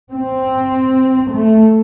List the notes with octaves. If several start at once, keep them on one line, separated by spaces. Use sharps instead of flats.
C4
A3